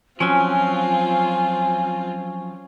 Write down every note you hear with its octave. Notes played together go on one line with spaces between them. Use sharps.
F3 F#3 C4 C#4 F4 G#5